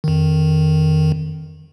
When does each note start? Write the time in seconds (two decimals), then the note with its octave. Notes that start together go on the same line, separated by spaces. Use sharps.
0.04 F2 D#3